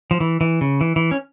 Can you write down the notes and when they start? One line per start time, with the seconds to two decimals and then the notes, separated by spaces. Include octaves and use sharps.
0.11 F3
0.20 E3
0.41 E3
0.61 C#3
0.81 E3
0.96 E3
1.11 C#4